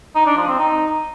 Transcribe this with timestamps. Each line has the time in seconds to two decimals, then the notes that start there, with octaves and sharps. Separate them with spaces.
0.15 D#4
0.26 D4
0.37 F3
0.48 C4
0.59 D#4